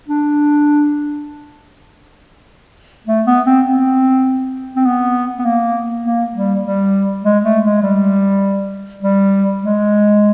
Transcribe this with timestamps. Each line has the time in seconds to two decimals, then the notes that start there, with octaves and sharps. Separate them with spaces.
0.08 D4
3.07 A3
3.27 B3
3.46 C4
3.67 C4
4.76 C4
4.86 B3
5.39 B3
5.45 A#3
6.05 A#3
6.34 G3
6.64 G3
7.25 G#3
7.44 A3
7.64 G#3
7.83 G3
9.03 G3
9.63 G#3